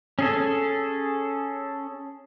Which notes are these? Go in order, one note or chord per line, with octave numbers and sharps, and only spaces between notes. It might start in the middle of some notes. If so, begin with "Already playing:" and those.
C#4 G#4 A4